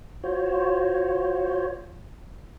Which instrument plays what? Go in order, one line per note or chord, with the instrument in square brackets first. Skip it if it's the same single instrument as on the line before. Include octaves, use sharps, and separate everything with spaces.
[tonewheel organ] F4 F#4 C5 C#5